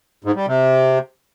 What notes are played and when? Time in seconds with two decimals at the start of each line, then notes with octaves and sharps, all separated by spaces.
0.24 G#2
0.36 G3
0.47 C3